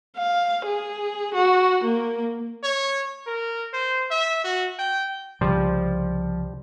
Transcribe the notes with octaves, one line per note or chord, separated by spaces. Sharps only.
F5
G#4
F#4
A#3
C#5
A#4
C5
E5
F#4
G5
C2 C#3 F3 G3 C5